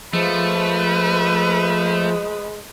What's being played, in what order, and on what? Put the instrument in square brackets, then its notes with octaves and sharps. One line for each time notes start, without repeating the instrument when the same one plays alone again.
[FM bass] F3 [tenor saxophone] G#3 [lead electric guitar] A3 [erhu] B4